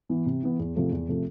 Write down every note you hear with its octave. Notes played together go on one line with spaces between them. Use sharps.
E3 B3
C3
E3 B3
E2
C3 F3 A3
E2
C3 F3 A3